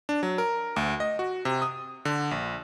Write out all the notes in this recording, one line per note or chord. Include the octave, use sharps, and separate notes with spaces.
D4
F#3
A#4
D2
D#5
F#4
C3
D#6
D3
A#1